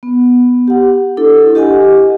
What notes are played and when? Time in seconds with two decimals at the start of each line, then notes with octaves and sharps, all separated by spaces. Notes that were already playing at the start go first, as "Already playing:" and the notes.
0.03 B3
0.68 G4 F#5
1.17 D4 E4 A4
1.55 G4 D#5 F#5 G#5